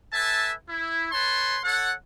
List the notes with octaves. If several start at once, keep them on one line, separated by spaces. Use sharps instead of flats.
A4 B4 E5 G#5 A5
E4
B4 C#5 A5 C6
A4 C#5 F#5